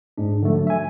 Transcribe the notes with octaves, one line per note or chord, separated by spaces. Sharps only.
G#2 G#3 D4
D3 F3 A3
F#3
E5 G#5